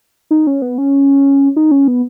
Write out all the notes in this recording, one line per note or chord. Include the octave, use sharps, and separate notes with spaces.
D#4
C#4
B3
C#4
D#4
C#4
B3